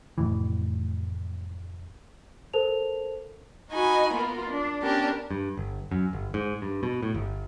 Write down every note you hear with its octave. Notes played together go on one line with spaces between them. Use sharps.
F1 A2 E3
A4 A#4 C5 A5 F7
D#4 F#4 G#5 B5
A#3 B3 F4
D4
B3 C#4 D4 G4 A#4
G2
G1
F#2
G1
G#2
G2
B2
A2
G1